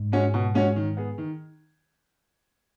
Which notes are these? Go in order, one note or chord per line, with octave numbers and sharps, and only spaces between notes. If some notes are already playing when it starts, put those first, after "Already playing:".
Already playing: G#2
G#3 C#4 F#4 C#5
B2
G#3 C#4 F#4 C#5
D#3
B3 G#4
D#3